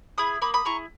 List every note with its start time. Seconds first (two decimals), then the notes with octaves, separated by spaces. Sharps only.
0.18 E4 G#4 B5 D#6
0.42 A#3 B5 D#6
0.54 B5 D#6
0.65 E4 G#4 A#5 C#6